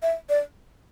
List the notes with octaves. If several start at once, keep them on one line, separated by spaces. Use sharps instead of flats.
E5
D5